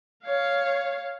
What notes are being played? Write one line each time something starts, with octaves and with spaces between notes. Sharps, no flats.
C#5 F5